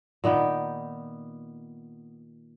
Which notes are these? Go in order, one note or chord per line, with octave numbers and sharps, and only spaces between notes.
A#2 D#3 B3 G5